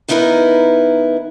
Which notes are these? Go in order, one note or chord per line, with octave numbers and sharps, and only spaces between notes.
D#3 B3 D#4 E4 A#4 B4